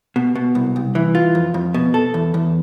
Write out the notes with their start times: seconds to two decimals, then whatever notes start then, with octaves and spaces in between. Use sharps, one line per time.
0.16 B2
0.35 B2
0.55 C2
0.76 C2
0.95 E3
1.15 F4
1.35 F2
1.54 F2
1.74 B2
1.94 A4
2.14 E2
2.34 E2